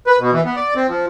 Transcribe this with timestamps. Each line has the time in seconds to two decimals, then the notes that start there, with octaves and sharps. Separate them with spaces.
0.07 B4
0.20 B2
0.32 E3
0.45 B3
0.56 D5
0.76 C4
0.89 F3